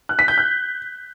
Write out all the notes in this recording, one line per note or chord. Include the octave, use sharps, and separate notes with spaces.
F#6
B6
G6
F#6